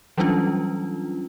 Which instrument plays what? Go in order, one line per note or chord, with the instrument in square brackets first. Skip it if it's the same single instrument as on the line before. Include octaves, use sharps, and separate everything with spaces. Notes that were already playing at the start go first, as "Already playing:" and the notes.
[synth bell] E3 F#3 G3 C#4 D4 F4